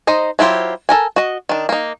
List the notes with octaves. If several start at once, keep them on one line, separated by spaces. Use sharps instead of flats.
D#4 C5 D#5
F#3 E4 F4 G4 C5
A4 A#4 G#5
F#4 D#5
D#3 D4
A#3 D#4